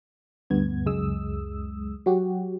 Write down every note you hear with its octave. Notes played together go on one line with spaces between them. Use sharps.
D2 G2 B3 G#6
C#2 F#2 G#3 D#6 E6
F#3 F#4 G4